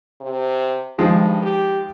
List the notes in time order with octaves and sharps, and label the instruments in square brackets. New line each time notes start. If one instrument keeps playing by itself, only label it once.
[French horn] C3
[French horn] G2 [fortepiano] D#3 F3 G#3
[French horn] G4